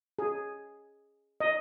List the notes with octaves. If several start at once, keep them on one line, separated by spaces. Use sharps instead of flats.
G#4
D#5